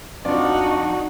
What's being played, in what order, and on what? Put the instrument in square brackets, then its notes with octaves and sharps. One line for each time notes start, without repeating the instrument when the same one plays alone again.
[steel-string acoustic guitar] F2 [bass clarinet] D4 [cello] D#4 F#4 [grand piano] D5